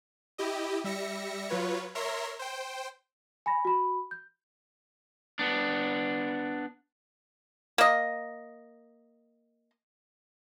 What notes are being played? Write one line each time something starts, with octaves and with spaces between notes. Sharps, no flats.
E4 G4 D#5
G3 E5 A#6 C#7
F#3 F4 B4 C#5
A#4 C#5 E5 A#5 C6
C5 G5
G#5 B5 A#6
F#4 B5
G6
B3 D4
A#3 D#5